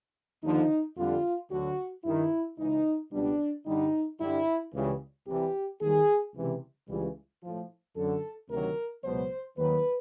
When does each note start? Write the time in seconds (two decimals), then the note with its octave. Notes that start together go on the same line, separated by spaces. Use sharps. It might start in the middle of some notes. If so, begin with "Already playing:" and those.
0.43 D#2 D3 F3 D#4
0.97 F2 D3 G3 F4
1.50 D2 D3 F#3 F#4
2.04 G2 D#3 G3 E4
2.58 C#2 C#3 E3 D#4
3.12 C#2 B2 G3 D4
3.66 G2 D3 G3 D#4
4.19 G2 D3 G3 E4
4.73 C#2 C#3 E3 G3
5.27 C2 C3 E3 G3 G4
5.81 D#2 D#3 G3 G#4
6.35 C#2 C3 E3 G3
6.88 C#2 C#3 E3 G3
7.43 A2 F3
7.96 F#2 D3 F#3 A4
8.49 D2 C3 D#3 F#3 A#4
9.03 C#2 B2 F#3 C5
9.57 D#2 D#3 F#3 B4